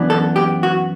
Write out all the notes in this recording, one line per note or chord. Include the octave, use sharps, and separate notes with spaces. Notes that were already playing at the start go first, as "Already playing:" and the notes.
Already playing: F#2 E3 B3 D4
A4
G4
F#4